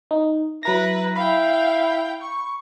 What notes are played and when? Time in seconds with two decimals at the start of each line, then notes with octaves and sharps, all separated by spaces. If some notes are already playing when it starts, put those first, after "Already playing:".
0.11 D#4
0.63 F#3 E4 B4 A#5 A#6
1.16 E4 F5 G5 B5
2.22 C#6